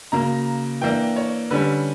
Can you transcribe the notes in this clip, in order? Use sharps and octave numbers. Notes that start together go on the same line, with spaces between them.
C#3 F#3 A#3 A#5
E3 A#3 D4 G5
C#5
D3 G3 C#4 B4